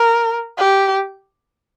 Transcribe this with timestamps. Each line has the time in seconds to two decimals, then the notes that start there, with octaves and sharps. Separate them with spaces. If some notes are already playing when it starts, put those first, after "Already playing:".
Already playing: A#4
0.58 G4